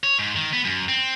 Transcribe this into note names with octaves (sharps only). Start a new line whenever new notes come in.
C#5
G#2
D#3
B3
F#2
C4